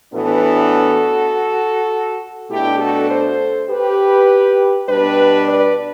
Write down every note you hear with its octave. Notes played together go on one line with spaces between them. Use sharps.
A2 E3 B3 D4 F#4 A4
B2 A3 D4 E4 G4
F#4 A4
A4 C5
G4 B4
B2 G3 D4 G4 B4
B4 D5